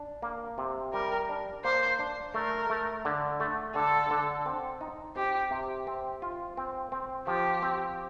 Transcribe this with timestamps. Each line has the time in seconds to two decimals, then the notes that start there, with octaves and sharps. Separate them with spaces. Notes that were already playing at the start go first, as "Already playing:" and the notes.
Already playing: D4
0.22 A#3
0.58 C3
0.93 G3 A#4
1.29 D4
1.65 A#3 C5
1.99 D4
2.34 A3 A#4
2.70 A3
3.05 D3
3.40 A3
3.75 D3 A4
4.11 D3
4.46 C4
4.81 D#4
5.16 C4 G4
5.51 C3
5.87 C4
6.22 F4
6.57 C4
6.92 C4
7.27 F3 G4
7.62 C4